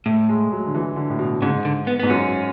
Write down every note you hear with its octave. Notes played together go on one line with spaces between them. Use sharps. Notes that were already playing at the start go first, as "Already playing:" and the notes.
A2 A3
G#3
F#3
D3
E3
D3
A2
B2
G#2 C#3
D3
B3
G#2 B3
F#2 C#4